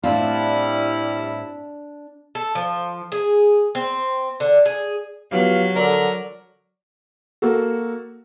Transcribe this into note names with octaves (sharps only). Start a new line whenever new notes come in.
A2 G3 C4 D4 E4 F4
A4
F3
G#4
C4
D3
G#4
F3 F#3 B3 G4 F5
D3 A#4 D5
A#3 F#4 A4